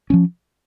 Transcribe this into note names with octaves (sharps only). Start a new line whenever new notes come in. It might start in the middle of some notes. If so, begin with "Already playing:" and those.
F3 G#3 C#4